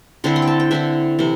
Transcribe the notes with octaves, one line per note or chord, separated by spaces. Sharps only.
D3 C4 E4 C6
C6
G5
A5
G5
D3 C4 E4 E5
C3 E3 C4